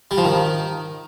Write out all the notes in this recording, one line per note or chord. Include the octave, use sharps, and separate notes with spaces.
G3
F3
D#3